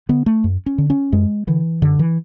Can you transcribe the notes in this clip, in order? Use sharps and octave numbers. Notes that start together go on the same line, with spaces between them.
D3 B3
A3
F#2
C#4
D3
C#4
F#2 G#3
D3 E3
F#2 D3
E3